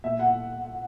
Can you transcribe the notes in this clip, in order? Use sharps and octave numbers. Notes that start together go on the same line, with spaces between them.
A#2 E5
F#5